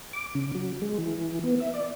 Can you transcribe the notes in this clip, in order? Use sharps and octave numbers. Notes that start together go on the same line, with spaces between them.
D6
C#3
F#3
G#3
E3
B3
E5
D5